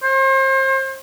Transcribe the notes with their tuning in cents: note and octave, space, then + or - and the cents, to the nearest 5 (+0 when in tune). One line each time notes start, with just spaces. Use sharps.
C5 +35